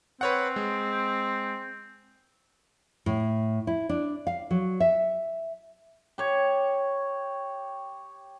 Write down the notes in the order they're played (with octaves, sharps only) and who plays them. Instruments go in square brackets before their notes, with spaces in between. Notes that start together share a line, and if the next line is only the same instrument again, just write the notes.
[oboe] C4 [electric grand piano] B4 C#5 F#5
[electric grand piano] G#3
[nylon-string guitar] A2
E4
D4
F5
F#3
E5
[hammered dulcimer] G4 C#5